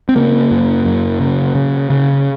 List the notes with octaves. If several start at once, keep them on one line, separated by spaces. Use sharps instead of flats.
C4
C#3 A#3
F#2
F#2
C#3
C#3
C#3